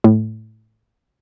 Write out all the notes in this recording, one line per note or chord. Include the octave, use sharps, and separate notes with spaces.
A2